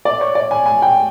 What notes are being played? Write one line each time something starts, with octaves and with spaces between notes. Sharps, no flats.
D5
C#5
D5
G#5
G#5
G5